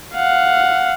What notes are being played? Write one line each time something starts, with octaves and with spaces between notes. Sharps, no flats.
F5 F#5